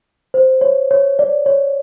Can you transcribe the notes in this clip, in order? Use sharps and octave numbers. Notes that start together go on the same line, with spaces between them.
C5
C#5
C#5
D5
C#5